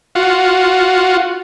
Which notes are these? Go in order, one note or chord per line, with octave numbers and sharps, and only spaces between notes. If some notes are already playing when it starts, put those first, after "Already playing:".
F4 F#4